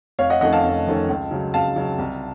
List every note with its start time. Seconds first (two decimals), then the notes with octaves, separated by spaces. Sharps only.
0.19 F1 C#5 F5
0.30 D#5 F#5
0.41 F2 D#3 A3 C#4 D#5 F#5
0.53 F5 A5
0.64 F1
0.87 F2 D#3 A3 C#4
1.09 C#2
1.31 C#3 F#3
1.54 C#2 F5 A5
1.76 C#3 F#3
1.99 C2